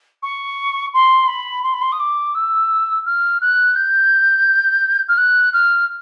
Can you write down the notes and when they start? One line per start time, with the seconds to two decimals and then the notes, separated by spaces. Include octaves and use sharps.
0.22 C#6
0.93 C6
1.27 B5
1.63 C6
1.73 B5
1.81 C6
1.92 D#6
1.99 D6
2.34 E6
3.06 F6
3.41 F#6
3.75 G6
5.08 F6
5.17 F#6
5.53 F6